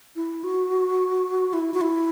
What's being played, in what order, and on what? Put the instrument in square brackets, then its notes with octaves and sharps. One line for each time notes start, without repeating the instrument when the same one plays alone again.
[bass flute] E4
F#4
E4
F#4
E4